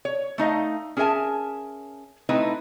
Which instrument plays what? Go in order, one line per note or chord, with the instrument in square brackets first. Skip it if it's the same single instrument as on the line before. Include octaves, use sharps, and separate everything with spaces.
[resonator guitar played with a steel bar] C#5
A3 D#4 D#5 F5
C#4 G#4 A#4 E5 G#5 A5
A3 C4 D#4 E4 B4